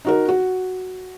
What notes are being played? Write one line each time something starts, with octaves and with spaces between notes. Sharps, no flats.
D#4 F#4 A#4
F#4